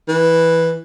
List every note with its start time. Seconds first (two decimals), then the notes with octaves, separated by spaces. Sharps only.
0.08 E3